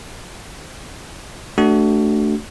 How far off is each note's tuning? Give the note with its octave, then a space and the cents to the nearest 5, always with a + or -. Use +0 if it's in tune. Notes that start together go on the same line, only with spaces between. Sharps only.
A3 +0 D4 +0 F#4 +25